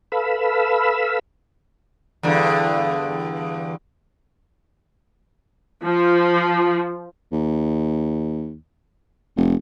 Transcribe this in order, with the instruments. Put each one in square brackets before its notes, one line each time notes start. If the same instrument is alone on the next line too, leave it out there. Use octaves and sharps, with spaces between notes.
[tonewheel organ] A4 B4 F5 B5 E6
[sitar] E2 G2 D3
[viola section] F3
[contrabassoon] D#2
F1